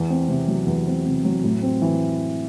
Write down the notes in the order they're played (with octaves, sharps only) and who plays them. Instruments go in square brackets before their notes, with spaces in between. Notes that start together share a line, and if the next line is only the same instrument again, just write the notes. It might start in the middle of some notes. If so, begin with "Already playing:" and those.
Already playing: [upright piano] E2
C4
C3
F#3
E2
C4
C3
F#3
A2
C4
E3